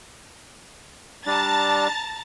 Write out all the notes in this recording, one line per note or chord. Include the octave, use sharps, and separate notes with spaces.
G3 D4 A5 A#5 A6